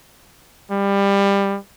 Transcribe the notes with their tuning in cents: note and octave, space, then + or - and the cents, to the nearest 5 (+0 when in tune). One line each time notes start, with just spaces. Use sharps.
G3 +20